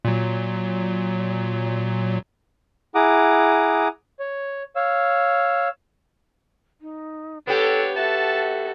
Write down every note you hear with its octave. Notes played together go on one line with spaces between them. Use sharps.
A#2 F#3
E4 G#4 F#5 A#5 D6 D#6
C#5
C#5 F5 E6
D#4
B3 D4 G4 A4 C#5
F#4 A4 E5 A5